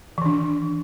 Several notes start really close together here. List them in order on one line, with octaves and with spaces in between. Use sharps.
E3 D#3 D4